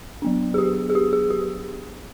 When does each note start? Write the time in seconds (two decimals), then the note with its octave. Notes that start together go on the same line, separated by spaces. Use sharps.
0.22 F#3 B3 D4
0.54 G#4
0.58 G4
0.90 G#4
0.95 G4
1.13 G#4
1.30 G4